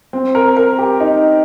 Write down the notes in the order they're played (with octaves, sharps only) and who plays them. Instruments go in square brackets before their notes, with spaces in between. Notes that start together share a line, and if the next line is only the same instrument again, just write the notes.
[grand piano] C4
A#4
A#4
G4
D#4